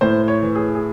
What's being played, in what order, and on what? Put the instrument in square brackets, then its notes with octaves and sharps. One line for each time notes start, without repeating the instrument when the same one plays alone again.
[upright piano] A2 C5
C#5
E3
G#4
G#4